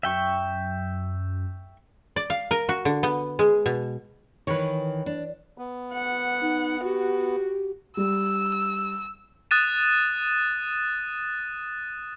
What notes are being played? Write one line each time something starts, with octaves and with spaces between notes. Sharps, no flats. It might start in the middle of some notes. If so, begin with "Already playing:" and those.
F#2 E5 G5 C#6
D5
F5
A#4
F#4
D3
B3
G#3
B2
D#3 E3 B4 C#5
D4
B3
F#5
D#4
F#4 G4
G3 E6
D#6 F#6 A6 D#7 E7